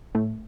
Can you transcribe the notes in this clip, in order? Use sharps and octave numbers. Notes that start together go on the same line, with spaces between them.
A2 A3